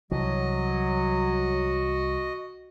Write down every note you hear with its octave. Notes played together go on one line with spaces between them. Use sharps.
C2 E3 F#3 F#4 D#5